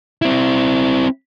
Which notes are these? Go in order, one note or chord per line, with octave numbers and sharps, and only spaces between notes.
C4 E4